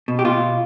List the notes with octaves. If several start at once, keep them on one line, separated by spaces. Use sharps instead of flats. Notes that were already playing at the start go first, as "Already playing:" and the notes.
B2
G4
B2 F4